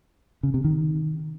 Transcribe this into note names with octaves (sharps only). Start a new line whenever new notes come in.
C#3
C3
D#3